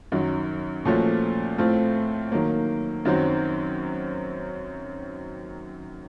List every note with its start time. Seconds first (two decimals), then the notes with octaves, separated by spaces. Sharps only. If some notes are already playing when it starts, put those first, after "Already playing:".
0.12 F#2 D#3 F#3
0.85 A#2 F3 A3 C#4 F#4
1.58 A2 A3 C4 F4
2.32 D#3 F#3 A#3
3.05 F#2 D#3 F#3 C4 F#4